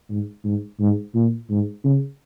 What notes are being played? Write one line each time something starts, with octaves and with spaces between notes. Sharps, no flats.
G#2
G#2
G#2
A#2
G#2
C#3